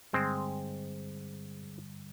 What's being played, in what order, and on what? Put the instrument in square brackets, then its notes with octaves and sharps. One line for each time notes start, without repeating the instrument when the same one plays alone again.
[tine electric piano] G2 D3 G3 [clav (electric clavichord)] G#3 C4